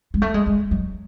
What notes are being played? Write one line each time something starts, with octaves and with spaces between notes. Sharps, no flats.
G#3
A3
G#3
G#3
F#3